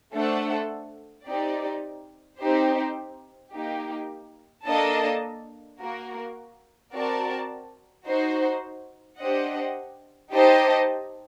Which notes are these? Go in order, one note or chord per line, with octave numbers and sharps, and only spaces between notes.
A3 D4 A4 C5 F#5
C4 D#4 G4 D5
C4 D#4 G4 C5
A#3 D#4 G4
A#3 D4 A4 D#5 A5
A#3 F#4 A#4
C4 F#4 A#4 D5 A5
D#4 F#4 C5
D4 G4 C5 D#5 F#5
D#4 G4 C5 D#5 A5